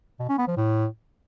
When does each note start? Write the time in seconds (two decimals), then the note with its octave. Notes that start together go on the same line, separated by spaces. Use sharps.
0.20 B2
0.29 C#4
0.38 B3
0.48 F3
0.57 A2